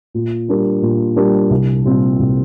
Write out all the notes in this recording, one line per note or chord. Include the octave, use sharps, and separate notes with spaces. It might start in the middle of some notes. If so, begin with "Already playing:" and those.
A#2
G3 D4 G4 A#4
A#2
G3 D4 G4 A#4
C2
A#2 G3 C4 F4
C2